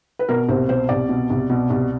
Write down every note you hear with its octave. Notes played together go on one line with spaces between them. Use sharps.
B4
B2 A#4
C2 C5
B2 C5
C2 D5
B2
C2
B2
C2